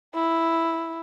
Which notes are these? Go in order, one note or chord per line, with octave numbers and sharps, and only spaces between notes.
E4